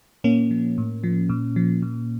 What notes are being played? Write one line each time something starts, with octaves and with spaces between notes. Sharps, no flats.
A#2 A#3 C#4
F3
A2
F3
A#2
F3
A#2